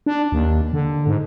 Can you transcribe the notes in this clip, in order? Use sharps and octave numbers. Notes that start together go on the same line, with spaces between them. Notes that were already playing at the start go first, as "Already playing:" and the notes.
D4
D#2
D3
G#2